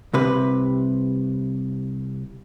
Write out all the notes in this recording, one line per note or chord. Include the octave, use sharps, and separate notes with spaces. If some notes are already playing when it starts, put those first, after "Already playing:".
C2 C3 B4